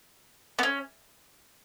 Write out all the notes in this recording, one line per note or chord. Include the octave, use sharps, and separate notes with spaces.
B3
C#4